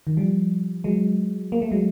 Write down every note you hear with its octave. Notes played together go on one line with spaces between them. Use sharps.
D#3
F3 G3
F#3 G#3
A#3
A3
F#3 G#3